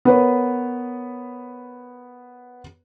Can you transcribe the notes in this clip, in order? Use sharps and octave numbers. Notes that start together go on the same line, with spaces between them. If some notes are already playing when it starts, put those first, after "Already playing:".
B3 A#4 B4 C#5